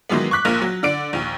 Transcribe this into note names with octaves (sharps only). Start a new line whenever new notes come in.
D#3 E3 F#3 G#3 B3
C#6 D6 F#6 B6
A#1 A#2 A#3 A#4 F6
F#3
D3 D5 D7
A#1 D#2